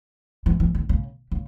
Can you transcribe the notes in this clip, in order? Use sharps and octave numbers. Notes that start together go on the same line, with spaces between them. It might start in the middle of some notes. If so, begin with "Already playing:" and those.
E3
E3
D3
C#3
C#3